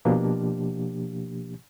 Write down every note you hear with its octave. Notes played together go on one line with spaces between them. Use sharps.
B2 F3 A#3 D4 G4